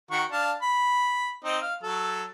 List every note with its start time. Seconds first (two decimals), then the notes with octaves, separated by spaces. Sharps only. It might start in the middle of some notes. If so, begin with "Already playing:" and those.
0.11 D#3 F#4 C#6
0.32 D4 F5 A5
0.62 B5
1.44 C4 D#4 D#5
1.61 F5
1.83 F#3 A4